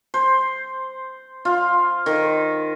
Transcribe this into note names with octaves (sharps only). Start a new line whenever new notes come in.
C5
F4
D#3